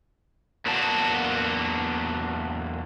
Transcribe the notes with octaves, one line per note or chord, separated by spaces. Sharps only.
E2 F#3 A#3 D4 F#4 A5